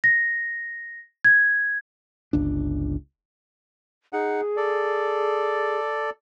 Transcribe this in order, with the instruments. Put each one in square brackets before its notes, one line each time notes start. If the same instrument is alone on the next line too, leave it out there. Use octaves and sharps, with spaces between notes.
[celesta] A#6
G#6
[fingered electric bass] G1 C#2 D4
[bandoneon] D#4 F#5 [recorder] G#4
[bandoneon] A4 D5